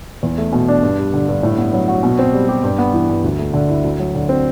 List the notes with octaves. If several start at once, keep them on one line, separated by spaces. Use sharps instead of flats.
E2
A3
B2
D4
G2
G3
D3
G2
A2
B3
F#3
F#4
B2
C4
G3
G4
G2
B3
E3
G2
D2
A3
D3
E4
D2
F#3
D3
C4